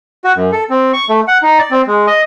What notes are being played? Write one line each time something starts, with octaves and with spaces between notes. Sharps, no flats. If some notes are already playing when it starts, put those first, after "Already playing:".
F#4
F#2
A4
C4
C#6
A3
F#5
D#4
D5
C4
G#3
D#5